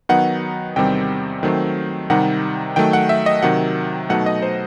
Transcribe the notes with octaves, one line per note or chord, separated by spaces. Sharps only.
D#3 F#3 B3 D#4 F#5
E2 C3 D#3 G3 C4 G5
D#3 F#3 A3 C4
C3 D#3 G3 D#4 F#5
D#3 F#3 A3 G5
F#5
E5
D#5
C3 D#3 F#3 F#5
B2 F#3 A3 D#4 F#5
D#5
C5